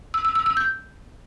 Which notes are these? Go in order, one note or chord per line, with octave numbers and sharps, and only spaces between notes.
E6
E6
E6
E6
G6